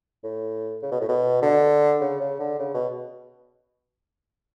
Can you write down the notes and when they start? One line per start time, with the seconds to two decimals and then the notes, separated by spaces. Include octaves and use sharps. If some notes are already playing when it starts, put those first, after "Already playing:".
0.24 A2
0.83 C#3
0.92 B2
1.00 A2
1.09 B2
1.42 D3
2.01 C#3
2.20 C#3
2.39 D3
2.59 C#3
2.74 B2